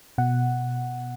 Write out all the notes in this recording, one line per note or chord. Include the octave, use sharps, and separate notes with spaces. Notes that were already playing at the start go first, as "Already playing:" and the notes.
B2 F#5